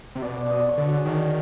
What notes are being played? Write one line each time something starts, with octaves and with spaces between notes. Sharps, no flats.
C3
B2 D5
D5
D#5
D5
C#5
D3
F#4
G#4
D#3 D4
C#4